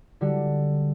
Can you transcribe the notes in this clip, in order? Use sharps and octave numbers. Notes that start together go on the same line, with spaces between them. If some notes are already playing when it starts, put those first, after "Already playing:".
D3 G3 F#4